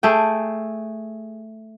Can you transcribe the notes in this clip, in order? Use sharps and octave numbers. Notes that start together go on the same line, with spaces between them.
A3 G#4 G5